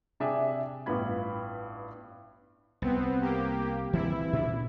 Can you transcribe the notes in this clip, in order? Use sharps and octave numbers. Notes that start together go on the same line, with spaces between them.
C3 D4 G#4 E5 G5
A1 G2 B3 F4 B5 G#6
C2 B3 C4
A#3 G4
E3 C4 E4
A#2 C#3 D4